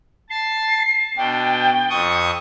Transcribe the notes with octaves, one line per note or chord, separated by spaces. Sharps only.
A5 C7
B2 D4 G5
F2 C#6 D#6